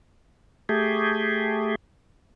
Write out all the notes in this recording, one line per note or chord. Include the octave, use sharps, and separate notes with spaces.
A3 G4 G#4